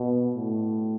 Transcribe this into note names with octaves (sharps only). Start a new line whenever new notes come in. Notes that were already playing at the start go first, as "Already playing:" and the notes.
Already playing: B2
A2